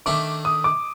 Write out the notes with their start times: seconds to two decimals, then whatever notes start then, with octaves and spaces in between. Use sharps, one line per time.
0.06 D#3 A3 D4 D6
0.45 D#6
0.64 D6